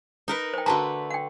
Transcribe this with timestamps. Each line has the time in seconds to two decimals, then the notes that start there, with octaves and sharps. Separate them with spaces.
0.28 D#4 A#4 B4
0.54 C5 G5
0.66 D3 A3 F#4 B4 A5 A#5
1.11 F#5 G5